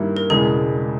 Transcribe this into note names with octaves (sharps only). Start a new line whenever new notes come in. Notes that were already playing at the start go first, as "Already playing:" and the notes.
Already playing: G2 D#3 G3 A#3 E4
A#4
E1 E2 C#3 G#3 G#4